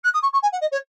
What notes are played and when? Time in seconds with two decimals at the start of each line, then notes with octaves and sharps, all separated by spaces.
0.04 F#6
0.13 D#6
0.22 C#6
0.33 C#6
0.42 G#5
0.52 F#5
0.61 D#5
0.71 C#5